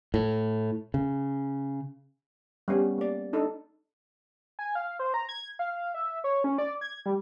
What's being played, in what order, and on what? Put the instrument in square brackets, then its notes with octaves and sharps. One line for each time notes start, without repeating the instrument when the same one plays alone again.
[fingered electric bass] A2
C#3
[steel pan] G3 B3 C#4
A#3 D5
D4 D#4 A4
[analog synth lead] G#5
F5
C5
A#5
G#6
F5
E5
C#5
C#4
D5
G#6
G3